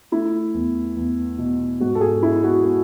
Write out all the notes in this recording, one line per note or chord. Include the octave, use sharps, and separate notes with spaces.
A3 E4
E2
E2
B2
G#2 F#4
A4
G#4
G#3 E4
F#4
F#4